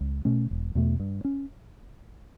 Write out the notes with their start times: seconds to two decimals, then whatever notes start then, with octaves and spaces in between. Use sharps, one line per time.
0.01 C#2
0.25 B2 A3 C#4
0.51 E1
0.75 E2 B2 A3
1.00 G2
1.25 C#4